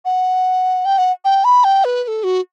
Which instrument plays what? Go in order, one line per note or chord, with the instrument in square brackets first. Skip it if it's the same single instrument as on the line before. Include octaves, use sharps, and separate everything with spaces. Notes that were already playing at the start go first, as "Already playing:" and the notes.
[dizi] F#5
G5
F#5
G5
B5
G5
B4
B4
A4
F#4